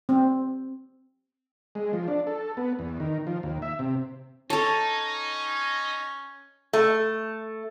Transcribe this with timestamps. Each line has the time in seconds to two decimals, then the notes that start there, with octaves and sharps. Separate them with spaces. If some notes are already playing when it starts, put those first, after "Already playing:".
0.09 C4
1.75 G#3
1.93 F3
2.08 D4
2.27 A4
2.57 B3
2.79 E2
3.00 D#3
3.27 F3
3.43 D#2
3.62 E5
3.79 C3
4.50 C#4 D#4 A4 C#5 A5 A#5
6.73 A3